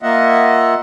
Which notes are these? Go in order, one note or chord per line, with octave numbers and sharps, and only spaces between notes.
A#3 F4 D#5 E5 F#5